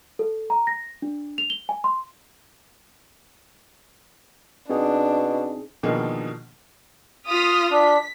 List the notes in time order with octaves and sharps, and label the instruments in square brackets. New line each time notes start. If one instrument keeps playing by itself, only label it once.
[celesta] A4
A#5
A#6
D4
F7
G7
G#5
C6
[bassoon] B2 [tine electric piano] C4 D#4 G#4 [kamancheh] D4
[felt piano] B2 D3 D#3 F3 A#3 G#4
[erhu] F4 [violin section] D#6 F6 B6
[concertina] D4 [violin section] B6